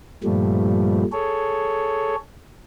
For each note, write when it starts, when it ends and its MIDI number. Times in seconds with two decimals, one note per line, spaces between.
0.24 1.03 43
0.24 1.03 46
0.24 1.03 53
0.24 1.03 55
0.24 1.03 57
1.12 2.16 68
1.12 2.16 69
1.12 2.16 73